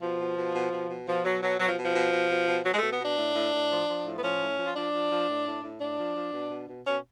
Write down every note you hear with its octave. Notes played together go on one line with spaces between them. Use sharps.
B2 F3
B2
B2
B2
B2
B2
B2 F3
B2 F#3
B2 F#3
B2 F#3
F3
B2
F3
B2
B2
B2
B2
B2 F#3
G#3
B2 A3
B3
B2 D4
A2
A2
A2
F3
F3
A2
B3
F3 C#4
A2
F3
F4
F3 D4
F3
F3
A2
A2
A2
A2 D4
F3
F3
B2
B2
B2
B2 C#4